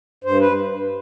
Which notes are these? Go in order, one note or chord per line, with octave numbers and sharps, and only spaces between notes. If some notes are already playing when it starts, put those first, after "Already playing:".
G2 C5
B4